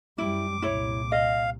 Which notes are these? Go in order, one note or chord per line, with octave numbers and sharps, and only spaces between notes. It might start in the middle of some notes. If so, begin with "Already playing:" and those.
F#2 G3 E4 D6
C2 A#2 E4 C#5
D#5 F5